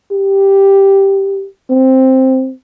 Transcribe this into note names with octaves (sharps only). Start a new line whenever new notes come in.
G4
C4